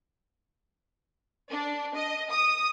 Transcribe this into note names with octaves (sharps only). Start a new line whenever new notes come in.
D4
D#5
D#6